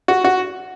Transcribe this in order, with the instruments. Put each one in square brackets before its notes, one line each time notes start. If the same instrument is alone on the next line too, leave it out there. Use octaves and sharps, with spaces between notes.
[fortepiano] F#4
F#4